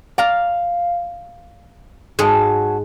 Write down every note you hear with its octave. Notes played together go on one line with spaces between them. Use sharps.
D5 F5 A#5
G#2 F#3 G#3 F#4 A5